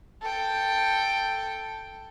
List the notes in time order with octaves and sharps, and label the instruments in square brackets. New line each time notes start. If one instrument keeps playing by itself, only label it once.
[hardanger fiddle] A4 G5